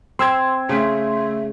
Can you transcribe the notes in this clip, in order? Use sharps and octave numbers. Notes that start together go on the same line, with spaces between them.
C4 C6 E6 G#6
C#3 A3